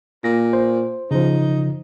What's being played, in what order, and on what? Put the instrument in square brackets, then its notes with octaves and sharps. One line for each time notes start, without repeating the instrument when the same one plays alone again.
[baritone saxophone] A#2 [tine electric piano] A#6
[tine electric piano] C5
[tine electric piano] C#3 F3 [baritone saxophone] D#4